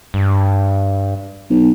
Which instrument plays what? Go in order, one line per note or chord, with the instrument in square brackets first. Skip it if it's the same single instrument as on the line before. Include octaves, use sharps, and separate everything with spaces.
[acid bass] G2
[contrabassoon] B1